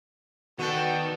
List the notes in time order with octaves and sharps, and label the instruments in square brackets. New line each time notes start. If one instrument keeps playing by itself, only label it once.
[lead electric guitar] D#3 [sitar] B3 A4 [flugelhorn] F#4 [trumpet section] D5 G5